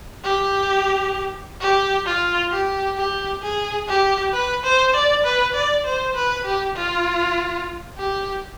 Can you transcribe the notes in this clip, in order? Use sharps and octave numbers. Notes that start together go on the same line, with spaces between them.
G4
G4
F4
G4
G4
G#4
G4
B4
C5
D5
B4
D5
C5
B4
G4
F4
G4